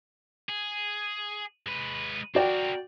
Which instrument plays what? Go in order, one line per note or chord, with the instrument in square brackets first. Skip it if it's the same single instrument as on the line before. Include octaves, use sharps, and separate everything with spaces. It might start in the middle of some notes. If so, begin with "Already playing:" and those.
[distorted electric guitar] G#4
G#3 B4
[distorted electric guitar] C4 A#4 [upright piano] F#4 D5 G5